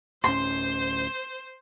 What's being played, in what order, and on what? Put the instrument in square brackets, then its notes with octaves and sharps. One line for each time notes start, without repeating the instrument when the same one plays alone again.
[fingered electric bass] D1 A2 C#4 [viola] C5 [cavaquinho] C6